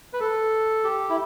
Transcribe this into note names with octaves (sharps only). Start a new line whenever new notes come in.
B4
A4
G4
E4